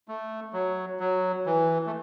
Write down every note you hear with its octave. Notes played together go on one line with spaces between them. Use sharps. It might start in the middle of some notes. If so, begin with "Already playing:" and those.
A3
F#3
F#3
E3
A3